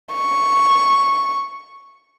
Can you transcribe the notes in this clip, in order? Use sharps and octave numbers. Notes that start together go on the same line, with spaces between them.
C#6